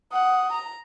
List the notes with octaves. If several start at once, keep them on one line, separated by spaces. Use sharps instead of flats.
F#5 D#6
A#5